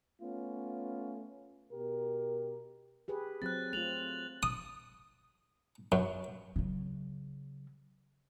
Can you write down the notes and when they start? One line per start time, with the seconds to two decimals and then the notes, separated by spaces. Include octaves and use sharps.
0.21 A3 B3 C#4 F4
1.72 B2 G4 A#4
3.08 G4 G#4 B4
3.42 F#3 C4 F#6 A6
3.73 A3 C4 F4 F7 F#7
4.43 D#6
5.92 F#2
6.56 C#3 F#3